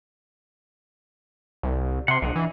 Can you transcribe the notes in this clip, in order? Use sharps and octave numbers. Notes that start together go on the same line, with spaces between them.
C2
C3 F#5 C6
B1 D4 D#4 F#5
E3